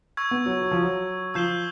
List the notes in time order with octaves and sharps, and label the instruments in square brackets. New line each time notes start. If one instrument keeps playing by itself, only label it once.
[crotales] C#6 E6 G#6
[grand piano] B3
F#3
F#3
F3
F#3
[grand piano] F3 [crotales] E6 G6 C7 E7 G7